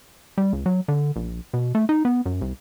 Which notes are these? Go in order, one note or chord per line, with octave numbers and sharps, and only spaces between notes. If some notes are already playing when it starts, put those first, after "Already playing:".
G3
C#2
F#3
D3
A#1
B2
A3
D#4
B3
F#2
C2